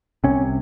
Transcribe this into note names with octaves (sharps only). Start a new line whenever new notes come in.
C2 C3 C#4